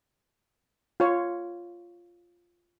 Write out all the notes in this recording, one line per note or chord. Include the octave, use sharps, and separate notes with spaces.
F4 C#5